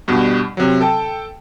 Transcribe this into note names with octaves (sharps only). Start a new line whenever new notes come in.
G2 B2 G3
C3 F#3
A4 G5 A5